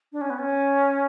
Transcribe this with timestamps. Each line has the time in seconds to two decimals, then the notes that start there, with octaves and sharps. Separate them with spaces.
0.13 D4
0.21 C#4
0.30 B3
0.39 C#4